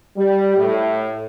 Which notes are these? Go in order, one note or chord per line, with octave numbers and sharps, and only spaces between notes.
G3
A2